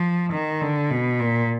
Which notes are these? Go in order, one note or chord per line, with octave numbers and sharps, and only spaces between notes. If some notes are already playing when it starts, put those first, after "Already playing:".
Already playing: F3
D#3
D3
B2
A#2